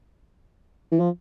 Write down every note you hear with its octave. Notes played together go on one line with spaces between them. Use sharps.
E3
F3